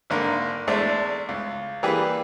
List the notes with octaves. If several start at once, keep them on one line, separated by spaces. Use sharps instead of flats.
G#1 D3 A#3 A#4
E2 G#3 A3 D4
C#2
E3 G3 A#3 G4 G#4 B4